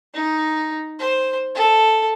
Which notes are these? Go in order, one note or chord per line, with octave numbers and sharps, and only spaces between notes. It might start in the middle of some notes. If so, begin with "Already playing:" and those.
D#4
C5
A4